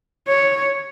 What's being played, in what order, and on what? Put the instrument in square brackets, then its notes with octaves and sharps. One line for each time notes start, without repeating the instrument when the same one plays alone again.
[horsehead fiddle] C#5